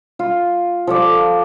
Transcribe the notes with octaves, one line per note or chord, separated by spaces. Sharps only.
F4
F3 A4 D5